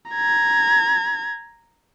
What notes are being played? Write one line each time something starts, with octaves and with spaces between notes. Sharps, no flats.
A#5 G#6